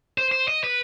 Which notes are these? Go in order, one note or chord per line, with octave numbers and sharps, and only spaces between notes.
C5
C5
D#5
B4